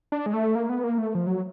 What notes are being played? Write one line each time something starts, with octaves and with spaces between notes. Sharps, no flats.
D4
G#3
A3
A#3
B3
A#3
A3
F3
F#3